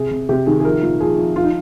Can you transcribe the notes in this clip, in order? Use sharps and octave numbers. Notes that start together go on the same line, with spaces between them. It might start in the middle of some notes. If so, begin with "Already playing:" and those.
Already playing: C3 G#4
C3
C3 G4
D#3 G#4
G#4
F3 A#4
A#2
F3 G#4
F3
F3 F4
D#4